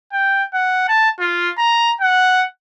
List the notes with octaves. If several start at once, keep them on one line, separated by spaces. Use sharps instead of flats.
G5
F#5
A5
F4
A#5
F#5